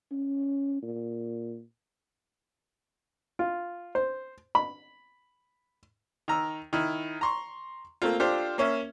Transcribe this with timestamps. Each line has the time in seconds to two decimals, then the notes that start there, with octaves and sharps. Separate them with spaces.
0.11 C#4
0.82 A#2
3.39 F4
3.95 C5
4.55 B5
6.28 D#3 A#5 E6
6.73 D#3 E4
7.21 A#5 C6 C#6
8.02 A3 A#3 C4 F4
8.20 D4 F4 G4 A4 C5
8.58 A#3 C#4 E5